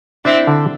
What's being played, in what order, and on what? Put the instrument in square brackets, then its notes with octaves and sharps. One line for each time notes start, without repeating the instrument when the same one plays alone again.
[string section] C4 E4 [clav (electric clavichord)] D4
[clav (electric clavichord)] D3